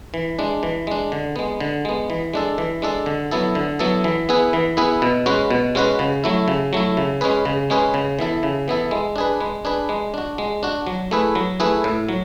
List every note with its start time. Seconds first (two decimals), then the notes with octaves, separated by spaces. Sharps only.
0.14 E3
0.39 G#3 D4
0.63 E3
0.87 G#3 D4
1.12 D3
1.36 G#3 B3
1.60 D3
1.85 G#3 B3
2.10 E3
2.34 G#3 D4 A4
2.58 E3
2.82 G#3 D4 A4
3.06 D3
3.31 F#3 B3 E4 A4
3.55 D3
3.79 F#3 B3 E4 A4
4.04 E3
4.29 B3 E4 G#4 B4
4.53 E3
4.77 B3 E4 G#4 B4
5.02 B2
5.26 G#3 C#4 F#4 B4
5.51 B2
5.75 G#3 C#4 F#4 B4
5.99 C#3
6.24 F#3 A3 E4
6.48 C#3
6.73 F#3 A3 E4
6.97 C#3
7.21 G#3 C#4 G#4 B4
7.45 C#3
7.70 G#3 C#4 G#4 B4
7.94 C#3
8.19 E3 B3 E4 A4
8.43 C#3
8.68 E3 B3 E4 A4
8.91 G#3
9.16 D4 G#4 B4
9.41 G#3
9.65 D4 G#4 B4
9.89 G#3
10.14 D4 F#4
10.38 G#3
10.63 D4 F#4
10.87 F#3
11.11 A3 E4 G#4 B4
11.35 F#3
11.60 A3 E4 G#4 B4
11.84 A2
12.09 F#3